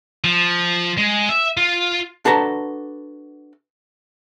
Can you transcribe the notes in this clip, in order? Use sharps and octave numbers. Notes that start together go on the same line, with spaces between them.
F3
G#3
E5
F4
D4 F#4 A4 B4 A5 A#5